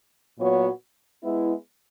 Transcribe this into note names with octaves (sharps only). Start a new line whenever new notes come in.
A#2 F#3 B3 F#4 C#5
G#3 B3 E4